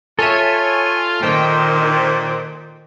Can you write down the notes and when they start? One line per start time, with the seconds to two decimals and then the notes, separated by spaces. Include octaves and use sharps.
0.19 F4 A4 C#5 E5 G#5 D#7
1.23 A#2 D#3 C5 G5